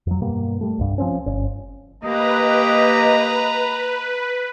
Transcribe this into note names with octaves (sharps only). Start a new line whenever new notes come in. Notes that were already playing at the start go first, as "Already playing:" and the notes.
F2 F#3
G2 B2 G3 A#3
G3 A3
C2 G2
F3 C4 C#4
G1 C#4
A#3 G4 B4 D#5 A#5